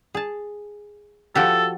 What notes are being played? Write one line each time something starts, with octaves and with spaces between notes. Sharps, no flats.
G#4 A5
F3 F#4 G4 A4